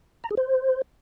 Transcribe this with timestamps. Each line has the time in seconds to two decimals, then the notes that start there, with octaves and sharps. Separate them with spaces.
0.24 A#5
0.31 G#4
0.37 C5